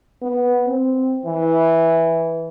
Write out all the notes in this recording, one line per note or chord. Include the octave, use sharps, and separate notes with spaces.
B3
C4
E3